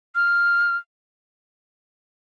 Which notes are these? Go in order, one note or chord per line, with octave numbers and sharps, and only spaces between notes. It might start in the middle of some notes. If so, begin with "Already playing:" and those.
F6